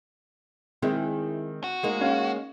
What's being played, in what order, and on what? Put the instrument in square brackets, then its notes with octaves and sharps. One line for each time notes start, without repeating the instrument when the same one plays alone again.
[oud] D#3 G#3 E4 [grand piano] C4
[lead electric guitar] F#4
[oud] G#3 A#3 D#4
[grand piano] C#4 F5